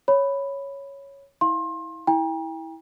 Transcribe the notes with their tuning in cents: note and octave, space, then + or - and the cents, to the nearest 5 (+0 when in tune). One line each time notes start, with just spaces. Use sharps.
C#5 +0 B5 +5
E4 -30 F5 +0 C6 +30
E4 -20 G5 +30 A#5 +40